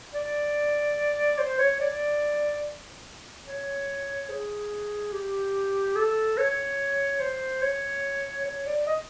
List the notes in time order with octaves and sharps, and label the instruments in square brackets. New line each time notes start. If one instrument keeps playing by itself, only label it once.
[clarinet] D5
C5
C#5
D5
C#5
G#4
G4
A4
C#5
C5
C#5
C#5
D5
D#5